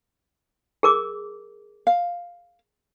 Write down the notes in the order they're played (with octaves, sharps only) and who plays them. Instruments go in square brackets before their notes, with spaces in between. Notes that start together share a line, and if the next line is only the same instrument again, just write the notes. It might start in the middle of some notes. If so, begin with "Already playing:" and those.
[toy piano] G#4 A#4 D6
[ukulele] F5